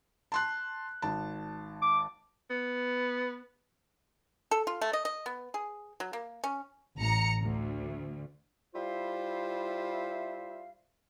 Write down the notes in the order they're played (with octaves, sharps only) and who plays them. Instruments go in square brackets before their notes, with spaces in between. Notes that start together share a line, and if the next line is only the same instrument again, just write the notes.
[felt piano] A5 C6 F#6
G#1 A5
[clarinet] D6
[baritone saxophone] B3
[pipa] A4
F4
A3
D#5
D#5
B3
G#4
F#3
A#3
C#4
[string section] A1 A2 A#5 C#7
D2
[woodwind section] G3 E4 F4 C5 E5 F5